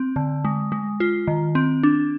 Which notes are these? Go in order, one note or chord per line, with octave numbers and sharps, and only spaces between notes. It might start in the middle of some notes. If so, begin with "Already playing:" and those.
Already playing: C4
D3
G#3
G#3
F4
D#3
C4
D4